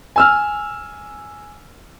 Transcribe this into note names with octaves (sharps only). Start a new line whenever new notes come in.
G#5 E6 F6